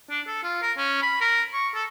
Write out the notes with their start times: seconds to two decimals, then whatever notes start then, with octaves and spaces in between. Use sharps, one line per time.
0.10 D4
0.27 A4
0.43 F4
0.62 A#4
0.77 C#4
1.02 B5
1.21 A#4
1.53 C#6
1.74 A4